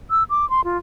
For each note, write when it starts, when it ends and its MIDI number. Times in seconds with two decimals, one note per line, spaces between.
0.10 0.23 88
0.30 0.48 86
0.50 0.64 84
0.64 0.77 65